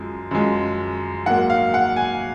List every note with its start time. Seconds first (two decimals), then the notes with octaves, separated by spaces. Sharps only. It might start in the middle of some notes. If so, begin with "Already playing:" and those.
Already playing: F#2 F3 G#3
0.31 F#2 F3 G#3
1.26 G#2 F#3 A#3 F#5
1.50 F5
1.74 F#5
1.96 G#5